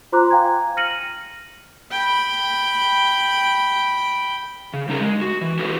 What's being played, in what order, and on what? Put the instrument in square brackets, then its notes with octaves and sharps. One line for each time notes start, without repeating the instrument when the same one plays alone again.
[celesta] F4 C5 A#5 C6 D6 F#6
F5 G5 G#5 A#5 G#6
F6 A#6 C#7 D#7 F#7
[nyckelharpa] G5 B5
[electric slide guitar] C#3
G3 C#4 D#4 G4 G#4 A#4
G#3
F#4
E3
E4 F#4 G4 A4 B4